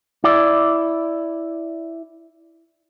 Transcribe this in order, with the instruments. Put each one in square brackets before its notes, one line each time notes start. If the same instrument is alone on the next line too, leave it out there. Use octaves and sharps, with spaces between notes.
[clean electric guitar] E4 D5